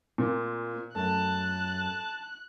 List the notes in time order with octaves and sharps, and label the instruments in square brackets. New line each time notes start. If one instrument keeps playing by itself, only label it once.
[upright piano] A#2 [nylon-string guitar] A#3 C4 F4
[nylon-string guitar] F#2 [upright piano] A3 [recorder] A5 [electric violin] F#6